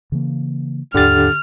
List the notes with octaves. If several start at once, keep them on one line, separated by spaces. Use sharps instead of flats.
C#3 E3 A#3
D#2 G#2 D3 G4 F6 A6